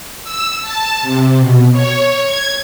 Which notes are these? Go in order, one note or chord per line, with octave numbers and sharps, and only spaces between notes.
E6
A5
C3
B2
C#5
G#6